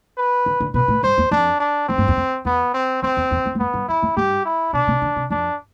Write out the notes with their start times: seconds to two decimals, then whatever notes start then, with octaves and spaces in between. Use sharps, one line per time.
0.18 B4
0.46 D3
0.60 D3
0.74 B2 B4
0.88 A2
1.03 G2 C5
1.18 E2
1.31 F2 D4
1.60 D4
1.88 F2 C4
1.98 G2
2.08 E2
2.17 F2
2.45 E2 B3
2.74 C4
3.02 E2 C4
3.17 E2
3.31 E2
3.46 F2
3.55 G2
3.59 F2 B3
3.74 G2
3.88 E2 E4
4.02 F2
4.17 G2 G4
4.45 E4
4.73 B2 D4
4.88 C3
5.02 D3
5.16 C3
5.31 F2 D4